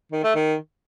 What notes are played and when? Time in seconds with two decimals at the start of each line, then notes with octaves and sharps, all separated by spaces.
0.12 D#3
0.23 A3
0.35 D#3